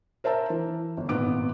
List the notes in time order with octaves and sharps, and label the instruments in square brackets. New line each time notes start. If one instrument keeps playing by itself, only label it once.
[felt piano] A#4 C5 E5 A5 A#5
E3
G1
G#1 A#2 B3 D6 D7